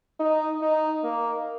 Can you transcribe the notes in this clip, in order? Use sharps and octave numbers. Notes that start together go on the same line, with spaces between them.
D#4
D#4
A#3